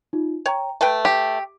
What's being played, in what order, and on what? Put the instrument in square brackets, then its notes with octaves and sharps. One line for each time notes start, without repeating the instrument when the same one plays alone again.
[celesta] D#4 F4
[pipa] C#5 [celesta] G5 A#5
[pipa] A3 B4 G5 [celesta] E5
[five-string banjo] G4